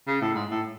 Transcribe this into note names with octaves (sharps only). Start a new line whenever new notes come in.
C#3
A2
G#2
A2